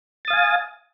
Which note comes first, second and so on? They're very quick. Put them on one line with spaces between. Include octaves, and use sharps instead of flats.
A6 D#6 F5 G#5